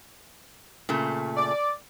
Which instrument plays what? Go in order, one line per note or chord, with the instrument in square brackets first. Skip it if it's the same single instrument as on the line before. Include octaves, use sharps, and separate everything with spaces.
[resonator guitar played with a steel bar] A#2 C#3 A3
[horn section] D5